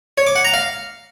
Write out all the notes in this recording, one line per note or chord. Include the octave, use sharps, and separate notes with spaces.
C#5
D6
F#5
A#5
F5